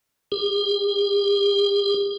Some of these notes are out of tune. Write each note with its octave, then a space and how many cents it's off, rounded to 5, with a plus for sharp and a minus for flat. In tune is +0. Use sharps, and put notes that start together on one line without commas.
G4 +45